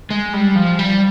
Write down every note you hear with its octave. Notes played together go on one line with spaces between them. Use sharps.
G#3
G3
F3
G3